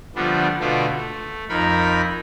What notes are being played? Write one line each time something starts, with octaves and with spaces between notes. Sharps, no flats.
D3 F3 G3 A3 B3 D4
B2 D3 A3 B3 F4 F#4
A3
F2 D#4 A#4 B5